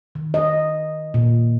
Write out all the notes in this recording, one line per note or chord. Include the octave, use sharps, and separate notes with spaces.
D#3
D#5
A#2